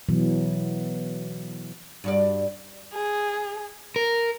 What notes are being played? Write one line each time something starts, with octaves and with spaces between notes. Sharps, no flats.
B2 E3 F#3
G2 F#4 D5
G#4
A#4